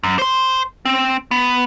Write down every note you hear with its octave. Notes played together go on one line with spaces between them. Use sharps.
F#2
C5 C6
C4
B3